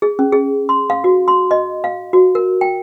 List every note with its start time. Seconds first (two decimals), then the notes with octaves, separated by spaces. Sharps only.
0.02 G#4
0.19 C#4
0.33 G#4
0.69 C6
0.90 F5
1.04 F#4
1.28 C6
1.51 D#5
1.84 F5
2.13 F#4
2.35 A#4
2.61 G5